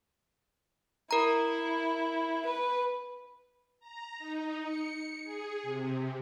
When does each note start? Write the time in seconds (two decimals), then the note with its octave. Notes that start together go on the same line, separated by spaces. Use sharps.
1.11 E4 A#4 A#5
2.45 B4
3.80 A#5
4.19 D#4
4.63 C#7
5.24 G#4
5.63 C3